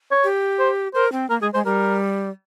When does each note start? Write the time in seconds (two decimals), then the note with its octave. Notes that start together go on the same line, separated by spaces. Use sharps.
0.11 C#5
0.24 G4
0.59 C5
0.95 A#4 C5
1.12 C4
1.30 A#3 A#4
1.41 G#3 G#4
1.54 G#3 C5
1.65 G3 A#4